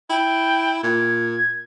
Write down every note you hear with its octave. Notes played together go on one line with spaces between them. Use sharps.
E4 G5
A#2 G#6